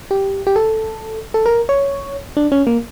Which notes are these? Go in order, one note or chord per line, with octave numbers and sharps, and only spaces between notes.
G4
G4
A4
A4
A#4
C#5
D4
C#4
A#3